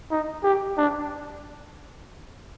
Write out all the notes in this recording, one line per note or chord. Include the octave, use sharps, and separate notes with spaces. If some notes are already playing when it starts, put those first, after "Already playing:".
D#4
G4
D4